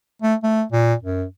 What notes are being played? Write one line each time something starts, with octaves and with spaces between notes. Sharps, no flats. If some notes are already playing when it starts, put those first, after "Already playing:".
A3
A3
A#2
F#2